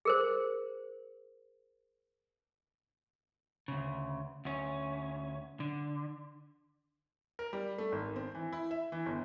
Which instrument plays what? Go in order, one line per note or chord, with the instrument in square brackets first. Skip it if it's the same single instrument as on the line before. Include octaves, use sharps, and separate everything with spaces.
[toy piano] G#4 A#4 C5
[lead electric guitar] D2 C#3
D2 C#4
D3
[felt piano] A#4
G3
A3
G#1
C4
E3
E4
E5
E3
G1